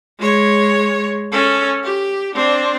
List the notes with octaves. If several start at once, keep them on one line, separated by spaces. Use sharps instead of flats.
G#3 C#5
C#4 A4
G4
C4 D4